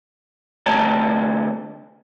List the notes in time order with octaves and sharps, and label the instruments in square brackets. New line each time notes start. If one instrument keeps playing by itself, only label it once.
[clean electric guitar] D2 C3 A3 C#5 A5 A#5